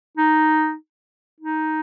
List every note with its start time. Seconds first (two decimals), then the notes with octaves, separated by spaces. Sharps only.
0.17 D#4
1.40 D#4